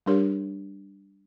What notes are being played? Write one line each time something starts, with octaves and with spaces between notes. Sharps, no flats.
G3 D4 G4 A#4 C#5